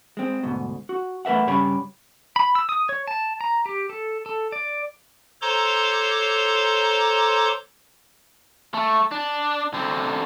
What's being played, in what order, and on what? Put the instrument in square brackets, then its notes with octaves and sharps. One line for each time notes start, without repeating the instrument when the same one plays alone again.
[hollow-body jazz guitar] G#3 C4
D2 G#2 B2
F#4
A3 A#4 B4 E5 F#5
G2 C#3 G4 C#5 B5
[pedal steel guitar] B5
E6
D#6
C#5
A5
A#5
G4
A4
A4
D5
[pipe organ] A4 C5 C#5 A#5 C6 D6
[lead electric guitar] A3
D4
D3 C4